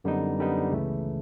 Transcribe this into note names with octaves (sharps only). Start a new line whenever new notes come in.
F#2 D3 G3 B3 D#4
F#2 D3 G3 B3 D#4
C#2 C#3 E3 A3